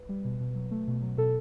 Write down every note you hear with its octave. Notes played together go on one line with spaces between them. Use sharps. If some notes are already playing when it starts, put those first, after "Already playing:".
Already playing: B4
G3
B2
B2
F#3
A3
B2
F#3
B2 A4